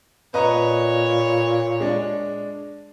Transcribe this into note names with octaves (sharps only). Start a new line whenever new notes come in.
A#2 B4 C#5 D#5 A#5
G#3 D4